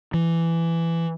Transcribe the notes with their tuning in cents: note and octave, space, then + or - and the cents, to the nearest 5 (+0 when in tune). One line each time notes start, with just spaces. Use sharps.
E3 +15